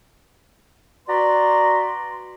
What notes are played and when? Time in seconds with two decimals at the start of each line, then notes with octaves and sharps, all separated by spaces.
1.08 F#4 B4 D5 A#5 C6